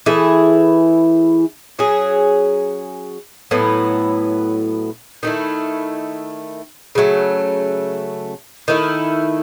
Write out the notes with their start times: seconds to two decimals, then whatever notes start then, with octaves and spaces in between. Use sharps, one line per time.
0.06 E3 A3 E4 G#4
1.79 F#3 C#4 G#4
3.51 A2 F#3 B3 E4
5.23 D#3 A3 E4
6.95 C#3 F#3 A3
8.68 D#3 A3 E4